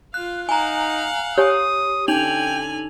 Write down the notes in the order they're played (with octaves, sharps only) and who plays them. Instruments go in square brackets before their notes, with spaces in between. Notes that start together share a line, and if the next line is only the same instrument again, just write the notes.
[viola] F4 F5 [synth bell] F#6
[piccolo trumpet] D#4 [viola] F5 F#5 [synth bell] G#5 A#5
[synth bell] G4 [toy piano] C#5 G#5 [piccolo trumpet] D#6
[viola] D3 G#5 [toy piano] C#4 [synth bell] D#4 F7 F#7 [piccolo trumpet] G5